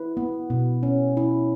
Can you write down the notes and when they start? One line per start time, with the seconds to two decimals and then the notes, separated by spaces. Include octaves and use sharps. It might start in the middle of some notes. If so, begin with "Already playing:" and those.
Already playing: E4 B4
0.17 B3
0.50 B2
0.83 C#4
1.17 E4